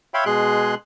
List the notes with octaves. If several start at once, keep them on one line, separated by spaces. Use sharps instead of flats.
C#5 E5 F5 G5 B5 C6
B2 G#3 G#4 C6 F#6